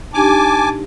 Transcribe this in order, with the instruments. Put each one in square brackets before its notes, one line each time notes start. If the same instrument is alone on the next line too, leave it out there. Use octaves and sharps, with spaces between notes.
[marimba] D4 D#4 G4 [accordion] G#5 D6 [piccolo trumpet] A5